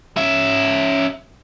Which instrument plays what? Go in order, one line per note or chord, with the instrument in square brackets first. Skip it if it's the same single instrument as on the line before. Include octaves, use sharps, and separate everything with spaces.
[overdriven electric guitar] C#4 E5